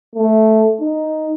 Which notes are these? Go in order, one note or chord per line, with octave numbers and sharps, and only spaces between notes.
A3
D#4